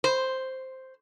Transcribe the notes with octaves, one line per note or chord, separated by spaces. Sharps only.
C5